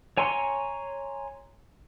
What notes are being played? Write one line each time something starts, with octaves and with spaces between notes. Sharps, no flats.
C#5 G#5 A#5 C6 C#6